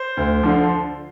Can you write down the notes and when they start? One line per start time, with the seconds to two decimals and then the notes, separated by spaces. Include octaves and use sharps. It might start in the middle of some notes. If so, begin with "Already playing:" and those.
Already playing: C5
0.17 D2
0.43 D3 F3